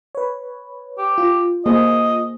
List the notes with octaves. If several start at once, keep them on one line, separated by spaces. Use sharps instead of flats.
B4 C#5
G4
F4
A#3 G#4 C5 D#5